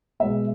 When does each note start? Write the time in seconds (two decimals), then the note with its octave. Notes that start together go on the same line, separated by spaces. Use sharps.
0.20 B2 G#3 B3 E5